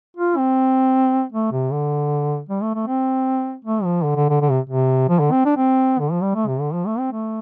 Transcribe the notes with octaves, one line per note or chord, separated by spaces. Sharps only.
F4
C4
A3
C3
D3
G3
A3
A3
C4
A3
F3
D3
D3
D3
D3
C3
C3
F3
D3
C4
D4
C4
D3
F3
G3
A3
C3
D3
F3
A3
C4
A3